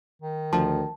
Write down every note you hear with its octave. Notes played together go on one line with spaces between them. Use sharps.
D#3
D2 F3 A5